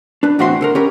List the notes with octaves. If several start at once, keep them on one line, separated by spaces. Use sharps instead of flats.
D4 B4
E2 A2 C4 F#4 E5 C6
D3 A4 A#4
C#4 G4 A#4 B4